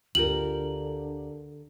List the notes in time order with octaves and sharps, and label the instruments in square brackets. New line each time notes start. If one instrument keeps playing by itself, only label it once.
[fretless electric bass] D2 [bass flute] D3 [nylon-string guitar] F4 G4 A#4 [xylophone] F#7